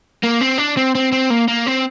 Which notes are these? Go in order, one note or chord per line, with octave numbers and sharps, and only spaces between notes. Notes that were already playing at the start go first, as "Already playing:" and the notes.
A#3
C4
D4
C4
C4
C4
A#3
A#3
C4